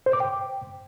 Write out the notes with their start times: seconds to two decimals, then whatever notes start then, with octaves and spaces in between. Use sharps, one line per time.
0.06 C5
0.13 D6
0.20 G5